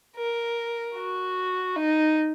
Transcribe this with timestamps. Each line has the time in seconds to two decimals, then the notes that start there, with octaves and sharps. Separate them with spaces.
0.16 A#4
0.95 F#4
1.76 D#4